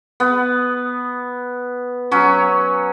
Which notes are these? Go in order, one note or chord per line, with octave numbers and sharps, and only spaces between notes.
B3
F#3 C#4